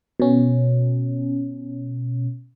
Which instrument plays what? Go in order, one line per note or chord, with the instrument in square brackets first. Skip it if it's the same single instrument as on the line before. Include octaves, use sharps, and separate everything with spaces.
[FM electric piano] B2 C#4